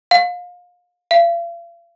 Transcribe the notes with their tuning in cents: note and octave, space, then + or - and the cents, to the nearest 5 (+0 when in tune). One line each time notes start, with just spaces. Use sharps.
F5 +30
F5 -40